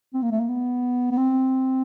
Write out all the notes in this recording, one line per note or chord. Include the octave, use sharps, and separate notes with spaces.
C4
A#3
A3
A#3
B3
B3
C4